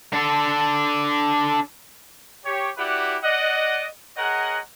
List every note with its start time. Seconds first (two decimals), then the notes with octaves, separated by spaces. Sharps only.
0.13 D4 A4
2.45 G4 C#5
2.77 E4 F#4 G4 B4 D5 F#5
3.23 D5 D#5 F#5
4.17 G#4 A#4 C#5 D#5 F#5